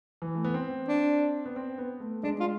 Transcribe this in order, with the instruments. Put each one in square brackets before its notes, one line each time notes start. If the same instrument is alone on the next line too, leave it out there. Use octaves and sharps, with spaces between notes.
[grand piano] E3
A3
B3
C4
[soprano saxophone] D4
[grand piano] B3
C4
B3
A3
[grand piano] G#3 [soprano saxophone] D4
[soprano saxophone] F4